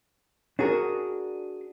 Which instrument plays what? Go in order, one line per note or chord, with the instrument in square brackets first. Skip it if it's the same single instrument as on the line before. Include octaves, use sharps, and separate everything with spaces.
[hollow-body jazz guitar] D4 F#4 G#4 A#4